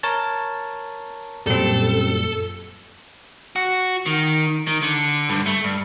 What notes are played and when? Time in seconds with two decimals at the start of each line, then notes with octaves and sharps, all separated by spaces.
0.03 A#4 C#5 A5
1.47 F#2 A#2 G3 C4 A4
3.56 F#4
4.06 D#3
4.67 D#3
4.82 D3
5.29 G2
5.46 A3
5.64 G2